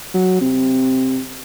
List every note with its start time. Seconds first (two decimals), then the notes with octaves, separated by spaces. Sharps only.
0.14 F#3
0.41 C3